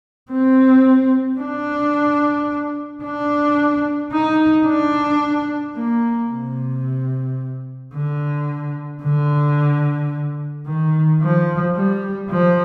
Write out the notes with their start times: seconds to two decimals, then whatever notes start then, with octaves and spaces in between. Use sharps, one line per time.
0.31 C4
1.40 D4
3.04 D4
4.13 D#4
4.67 D4
5.77 A#3
6.30 C3
7.95 D3
9.03 D3
10.66 D#3
11.22 F3
11.76 G3
12.30 F3